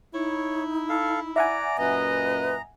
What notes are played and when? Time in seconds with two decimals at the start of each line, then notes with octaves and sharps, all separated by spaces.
0.14 D#4 E4 C#5
0.89 A4 F5
1.36 D5 E5 F#5 G#5 A#5
1.78 F#2 A#2 B4 D#5 A#5